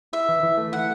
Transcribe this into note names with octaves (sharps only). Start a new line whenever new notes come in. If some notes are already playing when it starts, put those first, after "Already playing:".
E4 E5
E3
E3
A3
E4 F#5